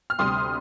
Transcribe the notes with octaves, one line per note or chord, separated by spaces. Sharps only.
F6
D2 C3 G3 C6 D#6